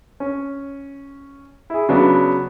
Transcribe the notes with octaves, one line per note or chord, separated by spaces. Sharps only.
C#4
E4 G#4
C#3 F#3 B3 D4